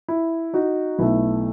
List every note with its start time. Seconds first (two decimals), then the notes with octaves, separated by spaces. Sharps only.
0.08 E4
0.54 D#4 F#4
0.99 B1 B2 A3 E4